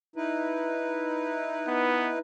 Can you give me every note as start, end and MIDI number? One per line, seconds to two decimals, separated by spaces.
0.16 2.19 63
0.16 2.19 64
0.16 2.19 71
1.67 2.12 59